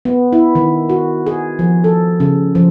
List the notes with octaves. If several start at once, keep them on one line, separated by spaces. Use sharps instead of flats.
B3
E4
D#3
F#4
G#4
F3
A4
C#3
F3